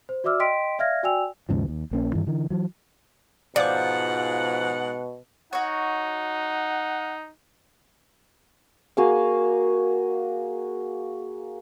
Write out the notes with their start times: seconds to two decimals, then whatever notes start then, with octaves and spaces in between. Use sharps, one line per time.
0.09 C5
0.24 F#4 D5 E5 D6 E6 F6
0.39 D#5 G5 C6 B6 D7
0.79 D5 E5 F5 F6 G#6 A#6
1.03 F#4 D5 G5 G#5 E6 F7
1.49 D#2 G#2 C#3 F3
1.68 D#2
1.91 A#1 A#3 C#4
2.12 G2 D#3 E3
2.27 D3 E3
2.50 E3 F#3
3.56 G#2 B2 F3 D5 F#5 D6
5.53 D#4 F#4 C#5 F#5
8.97 A#3 F#4 G#4 F5